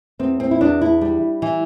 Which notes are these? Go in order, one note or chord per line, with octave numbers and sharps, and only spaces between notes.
E2 C4
C4
E4
E2 D4
E4
G3
E3